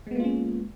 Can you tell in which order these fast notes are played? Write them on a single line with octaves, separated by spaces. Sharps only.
G#3 B3 A#3 F4 C#4